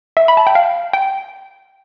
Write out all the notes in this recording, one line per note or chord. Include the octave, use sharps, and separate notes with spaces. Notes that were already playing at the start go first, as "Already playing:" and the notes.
E5
B5
A5
G5
F5
G5